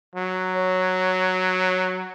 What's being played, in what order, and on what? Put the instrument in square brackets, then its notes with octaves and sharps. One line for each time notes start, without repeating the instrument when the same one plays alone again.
[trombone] F#3
[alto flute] C#5